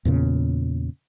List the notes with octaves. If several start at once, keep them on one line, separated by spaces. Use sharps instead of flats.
E2 A#2 C#3